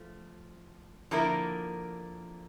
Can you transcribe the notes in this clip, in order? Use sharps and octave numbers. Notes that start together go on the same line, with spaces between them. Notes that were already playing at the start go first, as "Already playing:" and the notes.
Already playing: F3 A3
D3 F3 A#3 E4 A#4